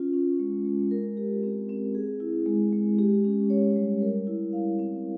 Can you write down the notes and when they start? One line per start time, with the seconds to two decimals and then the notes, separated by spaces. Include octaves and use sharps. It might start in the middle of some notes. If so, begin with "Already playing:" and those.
Already playing: C#4 F4
0.13 C#4
0.40 G#3
0.65 G#3
0.91 A#4
1.17 G4
1.43 C4
1.69 C4
1.95 G#4
2.20 E4
2.46 G#3
2.72 G#3
2.98 G4
3.24 C#4
3.50 C#5
3.76 G3
4.02 A#4
4.27 E4
4.53 F5
4.79 C4